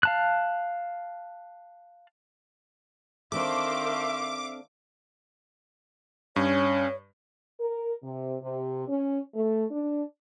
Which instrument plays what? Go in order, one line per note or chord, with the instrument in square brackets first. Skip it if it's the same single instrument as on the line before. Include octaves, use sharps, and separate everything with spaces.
[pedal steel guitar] F5 A5 F#6
[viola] D#3 C5 [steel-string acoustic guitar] C4 D4 A4 [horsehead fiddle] E5 F5 [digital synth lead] D6
[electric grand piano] G2 [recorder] C#4 [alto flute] C#5
[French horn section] A#4
C3
C3
C#4
A3
D4